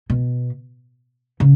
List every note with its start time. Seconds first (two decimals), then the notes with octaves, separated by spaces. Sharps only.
0.10 B2
1.40 C#3